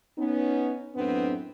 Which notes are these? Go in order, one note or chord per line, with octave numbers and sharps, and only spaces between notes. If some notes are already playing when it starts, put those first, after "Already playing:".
B3 C#4 D#4
F#2 A2 B3 C4 D4